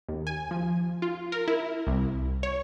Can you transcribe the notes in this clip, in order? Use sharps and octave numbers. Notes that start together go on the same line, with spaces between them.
D#2
G#5
F3
F4
A#4
E4
C2
C#5